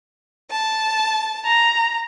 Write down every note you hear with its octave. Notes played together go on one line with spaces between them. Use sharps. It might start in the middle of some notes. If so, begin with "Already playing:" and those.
A5
A#5